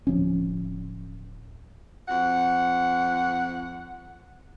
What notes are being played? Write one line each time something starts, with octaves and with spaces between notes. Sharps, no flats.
D1 F3 C#4
F2 F#5